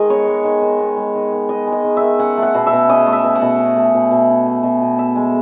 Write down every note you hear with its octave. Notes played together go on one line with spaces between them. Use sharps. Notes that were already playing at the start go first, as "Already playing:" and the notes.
Already playing: D#3 G#3 D#5
B3 C#5
G#3
D#3
D#3
B3
G#3
D#3
D#3
B3 D#5
G#3
D#5
D#3
D#3 E5
C#4 F#5
A3
F#5
B2
E5
B2
C#4 D#5
A3
E5
B2
F#5
B2
C#4
A3
B2
B2
C#4
A3
B2
B2
B3 E5
G#3